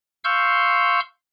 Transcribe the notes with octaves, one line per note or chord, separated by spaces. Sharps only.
F5 C6 C#6 E6 F6 G6